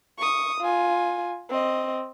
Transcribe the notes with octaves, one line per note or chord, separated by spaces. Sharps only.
C#6 D#6
F4 G#5
C4 D#5